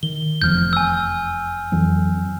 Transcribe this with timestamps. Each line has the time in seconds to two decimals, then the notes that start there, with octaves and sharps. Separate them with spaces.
0.03 D#3 G7
0.42 F1 E2 F3 F6 G6
0.73 G#5 E6
1.72 F2 E3 F#3